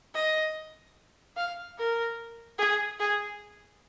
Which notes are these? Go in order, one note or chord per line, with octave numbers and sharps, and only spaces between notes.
D#5
F5
A#4
G#4
G#4